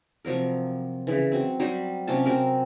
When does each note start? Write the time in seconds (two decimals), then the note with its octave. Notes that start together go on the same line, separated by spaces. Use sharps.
0.25 C3 F3 F#3 A#4
1.07 C#3 E3
1.32 F#3 C4
1.60 F#3 G3 C5
2.07 C3 C#4 F4 A5
2.25 C3 F#3 C4 A#4